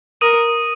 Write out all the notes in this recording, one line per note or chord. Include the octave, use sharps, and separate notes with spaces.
A#4 D#6 D#7